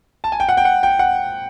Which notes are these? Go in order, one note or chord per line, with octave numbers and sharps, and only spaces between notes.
A5
G#5
G5
F#5
G5
F#5
G5
F#5